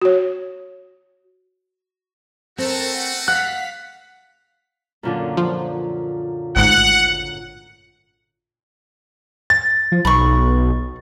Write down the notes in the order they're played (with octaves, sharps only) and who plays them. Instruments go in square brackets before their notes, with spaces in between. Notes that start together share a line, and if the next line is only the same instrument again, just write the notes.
[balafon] F#4 C#5
[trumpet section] A3 F#4 [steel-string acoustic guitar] C4 [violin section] A4 A#4
[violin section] F#5
[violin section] F5 B6 [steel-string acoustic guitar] F#5 [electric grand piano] F#6
[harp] F#2 A#2 D3
[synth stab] F3
[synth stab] G#1 D2 G#2 [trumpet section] F#5
[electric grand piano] A6
[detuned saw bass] F3
[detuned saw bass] B1 [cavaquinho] B5 C#6